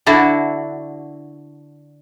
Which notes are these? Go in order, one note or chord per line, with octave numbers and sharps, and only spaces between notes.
D3 D4 E4 F#4